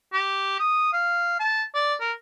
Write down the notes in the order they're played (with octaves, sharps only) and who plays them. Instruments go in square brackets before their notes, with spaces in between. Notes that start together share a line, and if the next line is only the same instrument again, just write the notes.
[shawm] G4
D#6
F5
A5
D5
A#4